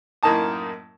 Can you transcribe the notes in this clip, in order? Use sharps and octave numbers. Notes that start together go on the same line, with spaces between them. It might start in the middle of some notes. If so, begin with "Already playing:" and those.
F#2 A2 A#3 D#4 A5 D#6